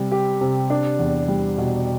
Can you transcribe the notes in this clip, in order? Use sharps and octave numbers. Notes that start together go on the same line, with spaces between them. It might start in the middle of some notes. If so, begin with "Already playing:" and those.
Already playing: C3 G3 C4
G4
C3
D4
E2
G3
B2